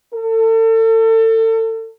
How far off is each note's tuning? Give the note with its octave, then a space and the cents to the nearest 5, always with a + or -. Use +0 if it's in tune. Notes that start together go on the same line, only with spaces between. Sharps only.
A4 +35